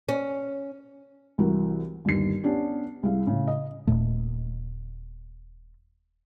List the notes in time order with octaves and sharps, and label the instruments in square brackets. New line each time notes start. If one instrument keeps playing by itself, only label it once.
[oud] C#4
[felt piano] C2 E3 F#4 A#4
G1 D#2 C7
B3 C#4 D4 G4
C2 E4 G#4 F5
A2 C#3
D#5
[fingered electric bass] D#1 D#2 A#2 A3